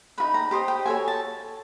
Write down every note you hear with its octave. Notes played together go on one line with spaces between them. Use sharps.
D#4 F#4 B4 B5
A#5
G4 C5 D#5
G5
F#4 A4 C#5 G#5
A5